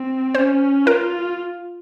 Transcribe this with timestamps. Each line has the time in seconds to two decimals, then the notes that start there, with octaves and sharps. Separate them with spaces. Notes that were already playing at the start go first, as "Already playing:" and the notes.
Already playing: C4
0.35 C#4 C5
0.86 F4 A#4